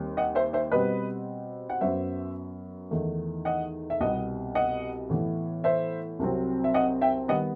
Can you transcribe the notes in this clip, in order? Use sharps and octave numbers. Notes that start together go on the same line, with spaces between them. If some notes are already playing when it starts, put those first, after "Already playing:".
Already playing: D#2 D#3 G3 C4
D#5 F#5
C5 E5
C5 E5
B2 G3 C4 B4 D#5
F#5
F#2 F#3 B3 C5 E5
E2 D#3 A3
D#5 F#5
E5
C2 B2 G3 B3 D#5 F#5
D#5 F#5
A2 E3 B3
C5 E5
C2 C3 F#3 C4
E5
D#5 F#5
E5 G5
D#3 G3 B3 D#5 F#5